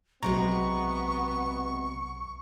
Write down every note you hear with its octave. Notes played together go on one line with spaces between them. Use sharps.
B1 C3 G#3 B3 F#4 A#5 C#6